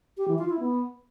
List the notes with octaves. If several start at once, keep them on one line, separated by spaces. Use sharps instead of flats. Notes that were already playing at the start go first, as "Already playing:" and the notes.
G4
E3
F4
E4
B3